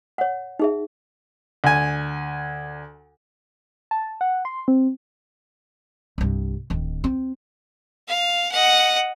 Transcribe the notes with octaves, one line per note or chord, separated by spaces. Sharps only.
C#5 F#5
D#4 G#4 E5
D2 G#5
A5
F#5
C6
C4
C2 G2
D1 D#3
C4
F5
D#5 F#5